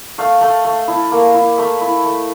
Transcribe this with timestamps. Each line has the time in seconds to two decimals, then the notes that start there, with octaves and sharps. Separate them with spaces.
0.18 A3 F5
0.41 A3
0.65 A3
0.88 E4
1.11 A#3
1.34 E4
1.58 A3 E5
1.81 E4
2.04 A3